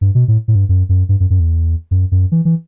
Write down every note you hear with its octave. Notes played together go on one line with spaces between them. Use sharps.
G2
B2
A2
A2
G2
F#2
F#2
G2
F#2
F#2
E2
F#2
F#2
E3
E3